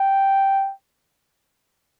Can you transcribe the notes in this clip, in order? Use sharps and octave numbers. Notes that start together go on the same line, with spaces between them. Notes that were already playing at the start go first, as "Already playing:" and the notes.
Already playing: G5